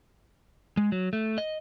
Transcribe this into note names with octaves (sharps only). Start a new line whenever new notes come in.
G#3
F#3
A3
D#5